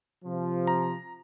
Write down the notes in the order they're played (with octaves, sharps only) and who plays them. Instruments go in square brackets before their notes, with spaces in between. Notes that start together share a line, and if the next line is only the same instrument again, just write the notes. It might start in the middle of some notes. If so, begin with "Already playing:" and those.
[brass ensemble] C3 F3
[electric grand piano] A#5